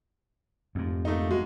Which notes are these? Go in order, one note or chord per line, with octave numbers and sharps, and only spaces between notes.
F1 F2 G#2
A3 A#3 D#4
G#3 F#4